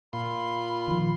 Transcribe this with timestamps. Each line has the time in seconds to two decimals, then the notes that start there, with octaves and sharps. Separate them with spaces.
0.13 A#2 F4 B5 C6
0.88 D#3 F3